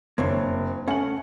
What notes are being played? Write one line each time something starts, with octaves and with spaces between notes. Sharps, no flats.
F#1 A#3 C4 D4 C#5
A3 C#4 F#5 F#7